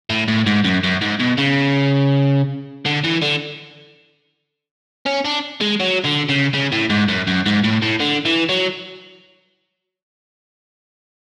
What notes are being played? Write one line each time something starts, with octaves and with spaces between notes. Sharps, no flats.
A2
A2
G#2
F#2
F#2
G#2
B2
C#3
D3
E3
D3
C#4
D4
G#3
F#3
D3
C#3
C#3
A2
G#2
F#2
F#2
G#2
A2
A2
D3
E3
F#3